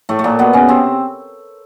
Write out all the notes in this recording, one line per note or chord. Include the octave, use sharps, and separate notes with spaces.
A2 A3
A3
A#2 A#3
B2 B3
C#3 C#4
C3 C4